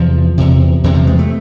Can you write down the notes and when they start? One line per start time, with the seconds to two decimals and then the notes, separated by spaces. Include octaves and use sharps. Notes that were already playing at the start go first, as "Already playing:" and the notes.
Already playing: E2 C3 F3
0.38 E2 C3
0.84 E2 C3 E3
0.95 F3
1.07 G#3
1.19 A3